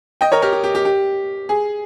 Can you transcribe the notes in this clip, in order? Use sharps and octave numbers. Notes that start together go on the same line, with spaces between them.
D#5 G5
A#4 C#5
G4 A#4
G4
G4
G4
G4
G#4